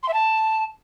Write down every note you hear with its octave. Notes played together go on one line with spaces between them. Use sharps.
C6
E5
A5